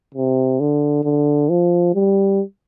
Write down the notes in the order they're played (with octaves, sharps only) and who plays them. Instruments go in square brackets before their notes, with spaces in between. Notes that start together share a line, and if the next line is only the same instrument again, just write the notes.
[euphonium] C3
D3
D3
F3
G3